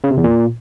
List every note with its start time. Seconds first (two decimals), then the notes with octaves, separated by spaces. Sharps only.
0.04 C#3
0.10 C3
0.17 E2
0.24 A#2